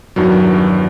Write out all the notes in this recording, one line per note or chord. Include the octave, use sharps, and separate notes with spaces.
E2 G2 D#3 F#3